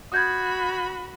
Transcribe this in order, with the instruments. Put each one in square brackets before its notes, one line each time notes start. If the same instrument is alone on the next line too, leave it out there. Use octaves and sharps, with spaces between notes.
[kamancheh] F#4 B5 [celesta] D#6 G6 G#6